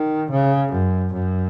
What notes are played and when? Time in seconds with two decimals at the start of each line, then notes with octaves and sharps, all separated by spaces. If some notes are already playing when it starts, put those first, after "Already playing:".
Already playing: D#3
0.30 C#3
0.72 F#2
1.13 F#2